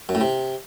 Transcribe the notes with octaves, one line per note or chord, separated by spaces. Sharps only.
F#2
A2
C3